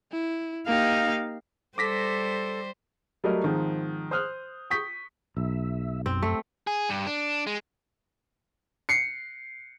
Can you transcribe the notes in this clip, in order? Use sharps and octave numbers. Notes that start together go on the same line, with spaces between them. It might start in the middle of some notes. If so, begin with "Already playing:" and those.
E4
A#3 D#4 G4 F5
G3 A4 C5 D6 A#6 B6
F#3 G3 A3 F#4 A#4 D#5
G#2 D#3 F3 C4
C5 D#6 F6 F#6
C#6 D#6 G6 B6
B1 E5
F#2 C4
A3
G#4
G2
D4
G#3
C7 C#7